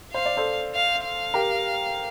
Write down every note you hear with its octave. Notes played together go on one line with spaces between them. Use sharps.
C5 F5
D5
A4 C5
F5
F5
G4 A#4